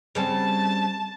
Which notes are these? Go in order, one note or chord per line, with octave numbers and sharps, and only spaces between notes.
C#3 G3 C4 A5